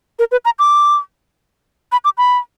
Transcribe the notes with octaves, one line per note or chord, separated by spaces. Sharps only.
A#4
B4
A#5
D6
B5
D6
B5